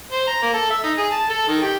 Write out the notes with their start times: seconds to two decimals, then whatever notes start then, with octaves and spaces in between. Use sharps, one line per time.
0.12 C5
0.27 A#5
0.42 A#3
0.54 A4
0.70 E5
0.83 D#4
0.98 G#4
1.12 A5
1.30 A4
1.48 D#3
1.62 G4